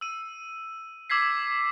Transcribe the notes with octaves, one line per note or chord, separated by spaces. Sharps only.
E6 D#7
D6 E6 G#6 B6 C7